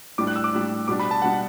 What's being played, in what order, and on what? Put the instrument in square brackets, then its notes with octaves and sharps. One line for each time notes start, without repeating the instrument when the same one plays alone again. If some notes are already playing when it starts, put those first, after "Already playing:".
[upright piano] A2 G3 D4 [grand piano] D6
[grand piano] F#6
E6
D6
[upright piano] A2 G3 D4
[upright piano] B2 G3 D4 [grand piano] D6
[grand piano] B5
A5
[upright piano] B2 G3 D4 [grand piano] F#5